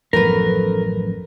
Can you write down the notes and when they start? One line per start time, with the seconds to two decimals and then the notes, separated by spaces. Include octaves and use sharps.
0.13 A1 F#2 F3 A3 B3 A#4 B4